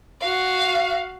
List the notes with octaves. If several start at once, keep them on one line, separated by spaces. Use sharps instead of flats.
F#4 F5